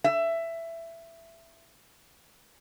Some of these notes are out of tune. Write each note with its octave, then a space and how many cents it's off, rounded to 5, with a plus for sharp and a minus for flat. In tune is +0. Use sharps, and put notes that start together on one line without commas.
E5 +15